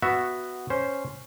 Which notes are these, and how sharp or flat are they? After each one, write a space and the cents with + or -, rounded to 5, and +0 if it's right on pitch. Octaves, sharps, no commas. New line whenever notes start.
B3 +0 F#4 +0 E5 +0
C#4 +0 C5 +0